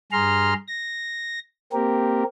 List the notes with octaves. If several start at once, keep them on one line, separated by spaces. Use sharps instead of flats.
G2 G#4 A#5 C6 F6
A#6
A#3 C4 G4 A#4